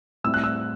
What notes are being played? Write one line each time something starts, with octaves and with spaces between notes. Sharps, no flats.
A2 G3 C4 E4 E6
F#6
E6